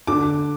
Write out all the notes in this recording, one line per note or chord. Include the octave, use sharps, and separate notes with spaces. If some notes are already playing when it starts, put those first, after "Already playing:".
D3 D6